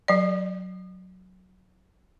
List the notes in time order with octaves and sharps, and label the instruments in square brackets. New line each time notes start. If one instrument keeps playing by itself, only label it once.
[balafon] F#3 D5